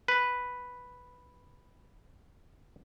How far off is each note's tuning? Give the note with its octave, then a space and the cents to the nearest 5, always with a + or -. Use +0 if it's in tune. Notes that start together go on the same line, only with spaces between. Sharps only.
B4 +0